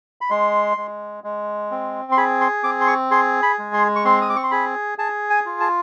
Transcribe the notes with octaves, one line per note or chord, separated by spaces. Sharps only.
B5
G#3 C6
G#3
G#3
C4
C6
G#4 B5
C6
C4 D6
C6
C#6
G#4 C6
B5
G#3
C6
C#6
C4 C6
D#6
D6
C#6
C6
G#4 B5
G#4 A5
G#5
F4
A5